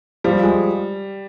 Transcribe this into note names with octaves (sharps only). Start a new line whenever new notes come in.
F3 G3
G#3